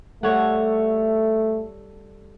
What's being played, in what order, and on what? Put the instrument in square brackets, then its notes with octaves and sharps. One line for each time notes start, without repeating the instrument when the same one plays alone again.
[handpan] G3 A4 [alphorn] A3 [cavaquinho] C#5 F#5